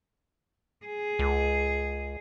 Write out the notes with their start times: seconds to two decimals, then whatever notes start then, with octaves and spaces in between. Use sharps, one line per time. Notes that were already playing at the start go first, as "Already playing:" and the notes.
0.85 G#4
1.19 C#2